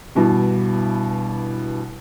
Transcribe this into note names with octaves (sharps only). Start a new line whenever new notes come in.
G2 B2 E3